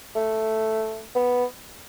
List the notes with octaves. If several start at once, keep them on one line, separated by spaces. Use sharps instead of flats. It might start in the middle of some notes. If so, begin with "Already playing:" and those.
A3
B3